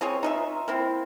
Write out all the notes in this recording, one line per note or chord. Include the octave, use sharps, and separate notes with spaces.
C4 F4 G#4 C#5
D#4 F4 E5
A#3 C4 E4